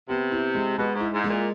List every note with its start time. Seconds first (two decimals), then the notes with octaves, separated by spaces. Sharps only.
0.09 C3 B3
0.32 E4
0.55 G#3
0.78 B2 G#3
0.95 G#2
1.00 E4
1.12 G#2
1.24 G#3
1.29 A#2